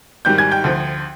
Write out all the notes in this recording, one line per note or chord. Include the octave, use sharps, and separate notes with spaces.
G#2 D#3 G3 G5 G6
G#5 G#6
G5 G6
D2 D3 F3